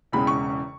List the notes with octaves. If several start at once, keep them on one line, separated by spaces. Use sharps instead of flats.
E1 E2 C#3 G#3 B5
C#6